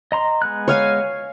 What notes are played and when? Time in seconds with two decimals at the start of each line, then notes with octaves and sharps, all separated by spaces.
0.12 D#5 A#5 C6
0.42 G#3 B3 F#6
0.68 C#5 F5 G#5